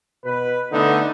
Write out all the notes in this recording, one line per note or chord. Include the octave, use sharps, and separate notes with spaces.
B2 B4
D3 A3 B3 D#4